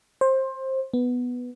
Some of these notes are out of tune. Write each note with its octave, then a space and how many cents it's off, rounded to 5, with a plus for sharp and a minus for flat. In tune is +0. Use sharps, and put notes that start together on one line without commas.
C5 +20
B3 +0